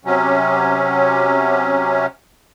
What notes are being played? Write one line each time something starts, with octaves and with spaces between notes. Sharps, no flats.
C3 F#3 C#4